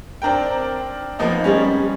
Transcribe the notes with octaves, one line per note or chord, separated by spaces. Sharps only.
C4 D4 A#4 G5
F3 A#3 B3 D#4
G3 G#3 C#4